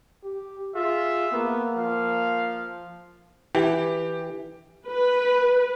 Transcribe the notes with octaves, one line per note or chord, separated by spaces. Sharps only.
G4
F4 G#4 E5
A#3 B3
F3 F5
E3 G4
B4